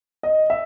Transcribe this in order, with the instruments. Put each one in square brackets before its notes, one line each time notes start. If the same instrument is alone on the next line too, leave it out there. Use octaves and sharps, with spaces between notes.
[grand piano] D#5
E5